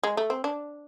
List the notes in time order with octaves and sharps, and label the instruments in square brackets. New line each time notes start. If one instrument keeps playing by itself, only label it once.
[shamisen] G#3
A3
C4
D4